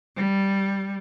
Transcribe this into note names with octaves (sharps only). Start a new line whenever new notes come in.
G3